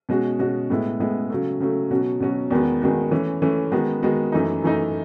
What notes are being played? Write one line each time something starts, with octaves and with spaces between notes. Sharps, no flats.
B2 G#3 C#4 F#4
B2 G#3 C#4 F#4
A2 G#3 B3 E4
A2 G#3 B3 E4
C#3 F#3 A3
C#3 F#3 A3
B2 F#3 C#4 F#4
B2 F#3 C#4 F#4
E2 D#3 G#3 B3 F#4
E2 D#3 G#3 B3 F#4
E3 A3 C#4
E3 A3 C#4
D#3 G#3 B3 F#4
D#3 G#3 B3 F#4
F#2 E3 A3 D#4
F#2 E3 A3 D#4